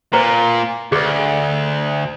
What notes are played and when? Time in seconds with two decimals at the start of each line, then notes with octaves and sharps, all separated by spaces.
0.13 A#2 B4 C5 A#5
0.92 D2 G#4 B4